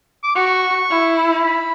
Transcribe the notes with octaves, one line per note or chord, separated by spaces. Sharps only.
D6
F#4 C#6
E4
B5